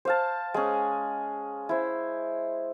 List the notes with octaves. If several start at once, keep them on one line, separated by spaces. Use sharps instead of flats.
C5 F5 A5
G#3 C#4
E4 C5